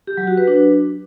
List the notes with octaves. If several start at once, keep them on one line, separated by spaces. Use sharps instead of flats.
G4
F#3
F#4
B4
D4